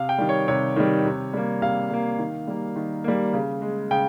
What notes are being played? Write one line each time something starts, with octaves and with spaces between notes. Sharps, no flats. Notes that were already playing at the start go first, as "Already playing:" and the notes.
Already playing: C3 F5
G5
D#3 G3
C#5
C3 C#5
D#3 G3
C3
G3 A#3
C3 F5
G3 A#3
D#3
G3 A#3
D#3
G3 A#3
C#3
G#3
C#3 G5